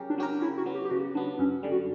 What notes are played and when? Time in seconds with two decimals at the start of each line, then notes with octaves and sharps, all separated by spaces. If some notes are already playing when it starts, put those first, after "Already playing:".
Already playing: C#3 F#3 C#4 G4 A#4
0.10 D4
0.18 F#3 C#4 G4 A#4
0.42 C#3 E4
0.58 F#4
0.66 F#3 B3
0.74 G4
0.85 G4
0.91 C#3 F#4
1.15 F#3 B3 D4
1.39 F#2 C#4
1.63 D3 G3
1.72 F#4